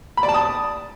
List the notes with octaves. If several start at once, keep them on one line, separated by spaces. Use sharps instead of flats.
B5
D5
A5
D#6